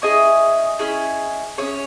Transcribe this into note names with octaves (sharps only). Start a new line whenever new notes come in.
C#4 E4 G#4 D#5
C#4 E4 G#4
C#4 E4 G#4 C#5